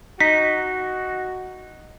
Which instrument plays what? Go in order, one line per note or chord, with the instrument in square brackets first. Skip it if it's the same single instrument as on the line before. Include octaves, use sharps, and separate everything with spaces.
[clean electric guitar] D#4 [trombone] F#4 [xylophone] B6